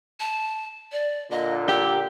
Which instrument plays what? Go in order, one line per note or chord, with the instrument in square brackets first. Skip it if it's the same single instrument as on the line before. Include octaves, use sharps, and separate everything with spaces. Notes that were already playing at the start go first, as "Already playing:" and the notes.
[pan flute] A5
D5
[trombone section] A#2 D3 A#3 [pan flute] D#5
[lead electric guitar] G4 [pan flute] E6